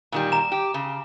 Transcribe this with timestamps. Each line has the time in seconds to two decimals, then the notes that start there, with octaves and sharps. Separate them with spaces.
0.12 A#2 D#3 G3
0.32 A#5 E7
0.52 G4
0.74 C#3